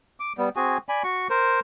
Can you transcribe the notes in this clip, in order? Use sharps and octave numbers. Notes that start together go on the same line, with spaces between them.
D6
G3 B3
C4 F#4 G#4 G#5
D5 G#5 B5
F#4 C#6
A#4 C5